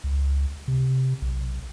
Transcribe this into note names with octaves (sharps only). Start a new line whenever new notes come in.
C#2
C3
B1